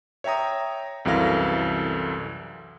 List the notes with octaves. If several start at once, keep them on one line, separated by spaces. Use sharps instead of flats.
C#5 E5 G5 A#5 D#6
C2 F#2 E3 A4 F5 A#6